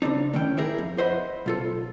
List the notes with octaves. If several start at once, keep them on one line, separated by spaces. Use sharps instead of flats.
C#3 C4 D4 D#4
A2 D#3 C#4 G5
D#4 E4 G4 G#4 A#4
F2
C5 D#5 E5 F#5 B5 C6
B1 F4 A4